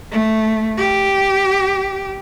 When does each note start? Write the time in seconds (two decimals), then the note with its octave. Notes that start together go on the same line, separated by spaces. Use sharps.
0.11 A3
0.77 G4